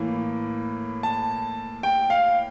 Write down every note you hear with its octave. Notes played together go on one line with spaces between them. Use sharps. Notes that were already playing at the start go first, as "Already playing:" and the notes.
Already playing: A2 E3 A#3
A5
G5
F5